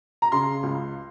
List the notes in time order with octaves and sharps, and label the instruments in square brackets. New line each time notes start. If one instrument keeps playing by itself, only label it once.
[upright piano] A#5
C#3 C6
C#2